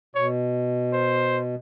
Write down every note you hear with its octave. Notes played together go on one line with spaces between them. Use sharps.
B2 C#5
C5